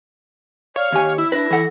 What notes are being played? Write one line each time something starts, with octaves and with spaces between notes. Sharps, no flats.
C#5 D5 F5
D#2 G4 G#5
E4 E6
D4 B4 A#6
E3 A4 F#5